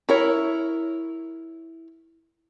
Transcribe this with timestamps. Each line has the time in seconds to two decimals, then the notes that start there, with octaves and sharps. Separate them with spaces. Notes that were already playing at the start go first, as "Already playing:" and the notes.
0.09 E4 A#4 C#5